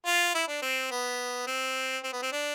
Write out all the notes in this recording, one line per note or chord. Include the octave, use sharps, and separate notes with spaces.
F4
E4
D4
C4
B3
C4
C4
B3
C4
D4